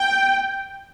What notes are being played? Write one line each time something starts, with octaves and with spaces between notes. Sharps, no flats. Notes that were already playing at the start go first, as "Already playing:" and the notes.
Already playing: G5